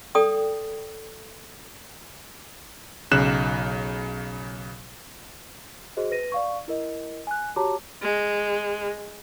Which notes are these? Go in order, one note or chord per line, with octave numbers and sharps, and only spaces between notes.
A4 D5 G5 D#6
B1 C#3 F#6 E7
F#4 G#4 C5 D#5
B4 A#6 D#7
D5 F5 C#6
E4 A#4 D#5
G#5 F#6
F#4 G4 C#5 A5 A#5 D6
G#3